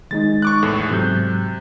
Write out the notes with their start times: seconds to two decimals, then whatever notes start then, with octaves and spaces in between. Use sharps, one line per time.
0.11 D#3 G#3 D#4 A6
0.42 C#6 D6 F#6
0.62 E2 A2 A3
0.90 G#2 C3 F#3 G6